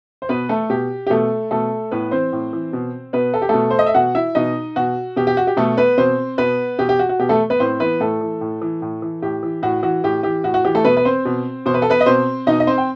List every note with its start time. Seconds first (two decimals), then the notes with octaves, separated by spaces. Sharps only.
0.22 C5
0.29 B2 B3 B4
0.49 A3 A4
0.70 B2 G4
1.07 G4
1.10 B2 A3 A4
1.51 B2 A3 A4
1.91 A2 B3 B4
2.11 E3 C4 C5
2.32 A2
2.53 E3
2.73 B2
3.13 B2 B3 B4
3.34 A4
3.42 G4
3.49 B2 A3 A4
3.71 C5
3.79 D#5
3.86 E5
3.94 B2 F#4 F#5
4.15 E4 E5
4.35 B2 D#4 D#5
4.76 B2 F#4
5.16 B2 G4
5.27 G4
5.37 F#4
5.47 G4
5.57 B2 A3 A4
5.77 B3 B4
5.98 B2 C4 C5
6.38 B2 B3 B4
6.79 B2 G4
6.89 G4
6.99 F#4
7.09 F#4
7.19 B2 G4
7.29 A3 A4
7.50 B3 B4
7.60 A2 C4 C5
7.80 E3 B3 B4
8.00 A2 A3 A4
8.21 E3
8.41 A2
8.62 E3
8.82 A2
9.02 E3
9.22 A2 G4
9.43 E3
9.62 A2 F#4
9.83 E3 F#4
10.04 A2 G4
10.23 E3 G4
10.44 A2 F#4
10.54 F#4
10.65 E3 G4
10.75 A3 A4
10.84 B2 B3 B4
10.97 B4
11.05 C4 C5
11.25 B2
11.66 B2 C5
11.74 B4
11.82 A4
11.90 B3 B4
12.00 D#5
12.06 B2 C4 C5
12.47 B2 D#4 D#5
12.60 D#5
12.67 C4 C5
12.78 G5